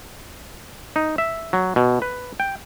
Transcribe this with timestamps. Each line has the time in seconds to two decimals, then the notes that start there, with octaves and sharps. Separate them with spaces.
0.96 D#4
1.18 E5
1.53 F#3
1.76 B2
2.02 B4
2.40 G5